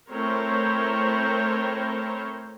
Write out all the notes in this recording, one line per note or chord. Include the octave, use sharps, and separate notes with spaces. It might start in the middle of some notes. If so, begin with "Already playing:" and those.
A3 C4 E4 A#4 C5 C#5